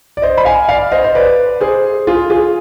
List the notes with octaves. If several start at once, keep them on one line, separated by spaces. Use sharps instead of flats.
D5
C5 D#5
B5
F5 G#5
D5 F5
C5 D#5
C5
B4 D5
G#4 C5
F4 G#4
F4 G#4